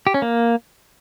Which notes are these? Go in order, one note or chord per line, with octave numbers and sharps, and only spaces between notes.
G4
C#4
A#3